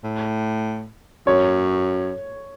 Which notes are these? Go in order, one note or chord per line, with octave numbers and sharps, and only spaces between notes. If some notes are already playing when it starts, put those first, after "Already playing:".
A2
F#2 C#5